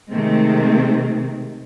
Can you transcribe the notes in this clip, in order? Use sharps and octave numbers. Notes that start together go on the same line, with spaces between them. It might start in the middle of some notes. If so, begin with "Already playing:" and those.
C3 D#3 G#3 A3 C4